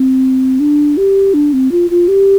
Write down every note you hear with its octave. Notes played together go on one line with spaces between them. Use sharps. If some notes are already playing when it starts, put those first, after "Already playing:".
Already playing: C4
D4
G4
D4
C4
F4
F4
G4